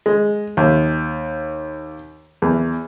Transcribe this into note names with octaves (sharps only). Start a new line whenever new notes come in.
G#3
D#2
E2